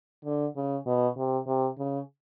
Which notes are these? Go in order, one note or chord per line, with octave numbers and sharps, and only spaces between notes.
D3
C#3
B2
C3
C3
C#3